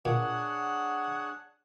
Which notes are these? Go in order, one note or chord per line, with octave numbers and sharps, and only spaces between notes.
A#2 D4 G#4 C#5 F#5